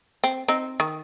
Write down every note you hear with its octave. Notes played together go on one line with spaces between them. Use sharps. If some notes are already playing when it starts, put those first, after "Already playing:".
C4
C4 D#4
D#3